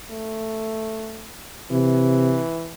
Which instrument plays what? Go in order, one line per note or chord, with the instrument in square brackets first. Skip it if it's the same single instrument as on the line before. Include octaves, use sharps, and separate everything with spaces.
[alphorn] A3
[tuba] C3 [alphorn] E3